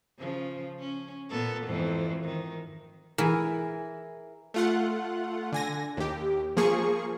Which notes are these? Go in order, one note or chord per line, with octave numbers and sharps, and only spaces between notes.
C#3 F3
C#4
A#2 B3 A4
F2 G#2 E3
D#3
E3 G#4 A#4
A3 F4 F#5
D3 G#5 A#6
D#2 G4
F3 A#3 G#4 C#6